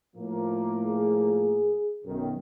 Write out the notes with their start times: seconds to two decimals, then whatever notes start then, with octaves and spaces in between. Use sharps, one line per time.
0.16 A2 F3 A#3
0.87 G#4
2.05 B1 F#2 D#3